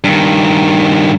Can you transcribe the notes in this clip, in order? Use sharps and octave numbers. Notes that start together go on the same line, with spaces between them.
G2 D#3